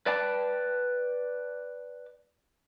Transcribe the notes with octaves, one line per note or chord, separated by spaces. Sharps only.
B4 D5 G5 A5